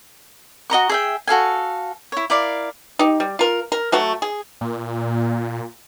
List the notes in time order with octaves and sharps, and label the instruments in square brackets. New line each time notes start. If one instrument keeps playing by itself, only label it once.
[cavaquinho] F#4 D#5 A#5 C#6
G#4 E5 G5
F#4 A4 F5 G#5
E4 C#5
E4 A#4 D5 F5
[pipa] D#4 G4
G3
F4 A#4
A#4
F#3 A3 F#4
G#4
[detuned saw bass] A#2